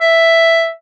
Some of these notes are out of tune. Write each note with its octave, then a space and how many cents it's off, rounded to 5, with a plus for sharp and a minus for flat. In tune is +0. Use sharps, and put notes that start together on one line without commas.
E5 +5